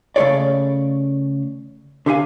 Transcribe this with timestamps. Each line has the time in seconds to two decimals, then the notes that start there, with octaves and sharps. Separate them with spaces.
0.16 C#3 A3 F#4 G#4 C#5 D5
2.06 D3 G4 F5 G#5